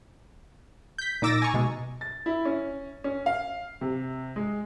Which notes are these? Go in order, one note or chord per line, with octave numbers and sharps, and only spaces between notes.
G6 B6
A#2 D#4 D6 E6 A6 A#6
G#5 A#5 C#6
B2 G#3
A6
E4
C#4
C#4
F5
C3
G#3